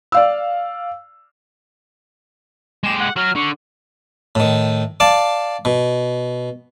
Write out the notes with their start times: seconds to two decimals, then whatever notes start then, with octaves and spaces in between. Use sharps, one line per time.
0.12 D5 F5 E6
2.84 G#3 G4 E7
2.99 F#5
3.16 F#3 F#4 F6
3.35 D3 C#6
4.35 A2 D#3
5.00 D5 F5 A5
5.65 B2